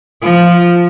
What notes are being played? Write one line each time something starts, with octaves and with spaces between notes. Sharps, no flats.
F3